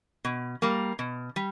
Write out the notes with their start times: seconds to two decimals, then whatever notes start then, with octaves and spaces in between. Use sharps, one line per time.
0.25 B2
0.62 G3 A#3
0.99 B2
1.36 G3